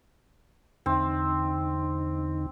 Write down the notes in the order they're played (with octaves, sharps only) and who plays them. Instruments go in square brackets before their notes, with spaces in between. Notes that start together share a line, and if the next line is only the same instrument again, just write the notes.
[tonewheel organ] E2 D3 D#4 [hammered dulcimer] C4